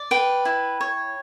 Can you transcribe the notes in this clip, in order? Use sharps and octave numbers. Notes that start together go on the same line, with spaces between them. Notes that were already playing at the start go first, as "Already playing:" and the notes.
Already playing: D5
B4 G5
E4
C#5